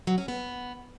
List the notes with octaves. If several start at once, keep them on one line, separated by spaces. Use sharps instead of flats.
F#3
C#4
B3